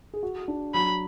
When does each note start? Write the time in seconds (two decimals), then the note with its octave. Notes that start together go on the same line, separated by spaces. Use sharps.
0.14 G#4
0.23 F#4
0.48 D4
0.74 F#3 B5